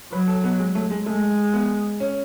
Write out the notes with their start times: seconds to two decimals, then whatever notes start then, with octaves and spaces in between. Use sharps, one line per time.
0.13 F#3 B4
0.28 A4
0.44 B3
0.59 G#3
0.75 A3
0.90 G#3
1.06 G#3 A3
1.54 B3
2.00 C#4